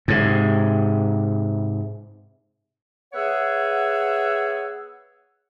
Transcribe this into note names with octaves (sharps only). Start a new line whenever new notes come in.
G#2 C3
B3 G#4 C#5 E5 F#5